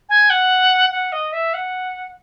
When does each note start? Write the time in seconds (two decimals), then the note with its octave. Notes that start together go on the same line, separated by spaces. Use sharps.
0.09 G#5
0.30 F#5
0.91 F#5
1.12 D#5
1.33 E5
1.54 F#5